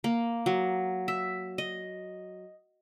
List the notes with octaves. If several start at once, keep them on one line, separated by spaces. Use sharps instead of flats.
A#3
F#3
E5
D#5